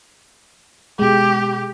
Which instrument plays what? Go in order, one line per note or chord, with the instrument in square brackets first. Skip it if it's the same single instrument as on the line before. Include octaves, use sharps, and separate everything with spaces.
[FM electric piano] B2 G#3 [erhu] G4